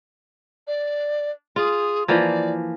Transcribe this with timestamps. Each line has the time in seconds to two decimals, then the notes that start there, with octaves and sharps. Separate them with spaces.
0.67 D5
1.56 F4 G#4
2.08 E3 F3 A#3 D5